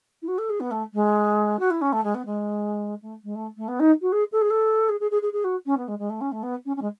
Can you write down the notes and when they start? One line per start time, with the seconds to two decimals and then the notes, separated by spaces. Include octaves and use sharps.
0.22 E4
0.28 F#4
0.38 A4
0.50 G#4
0.60 B3
0.71 A3
0.94 G#3
1.59 F#4
1.71 E4
1.81 C#4
1.93 A3
2.04 G#3
2.15 B3
2.26 G#3
3.02 A3
3.24 G#3
3.35 A3
3.57 A3
3.68 B3
3.80 D#4
4.02 F#4
4.12 G#4
4.32 A4
4.41 G#4
4.50 A4
4.89 G#4
5.00 G#4
5.11 G#4
5.22 G#4
5.33 G#4
5.44 F#4
5.66 C#4
5.77 B3
5.88 G#3
5.99 G#3
6.10 A3
6.21 C#4
6.32 A3
6.43 B3
6.66 C#4
6.76 C#4
6.82 G#3